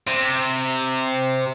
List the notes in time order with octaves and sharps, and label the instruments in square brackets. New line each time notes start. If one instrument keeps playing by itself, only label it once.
[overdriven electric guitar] C3